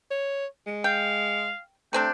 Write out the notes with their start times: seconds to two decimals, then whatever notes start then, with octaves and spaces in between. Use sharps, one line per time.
0.11 C#5
0.66 G#3
0.84 F5 G5
1.93 C3 A3 C4 D4 G5